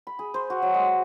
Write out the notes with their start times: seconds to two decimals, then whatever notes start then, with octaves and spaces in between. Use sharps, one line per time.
0.07 B5
0.19 G#4
0.34 C5
0.50 F#4
0.62 F#3
0.74 G#3